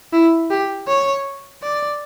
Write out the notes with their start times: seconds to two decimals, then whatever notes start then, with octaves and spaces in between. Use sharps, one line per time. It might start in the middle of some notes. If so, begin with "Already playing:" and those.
0.13 E4
0.50 G4
0.88 C#5
1.63 D5